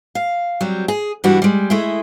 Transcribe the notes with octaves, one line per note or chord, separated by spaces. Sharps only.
F5
F#3 G3 C4
G#4
G2 E3 G3 D4 F#4
G3 G#3
G#3 A3 E4 G#4